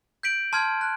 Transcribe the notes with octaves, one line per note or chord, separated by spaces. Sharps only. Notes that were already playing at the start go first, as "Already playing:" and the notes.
G6 B6 D7 F#7
A5 C6 F6 G#6
F#6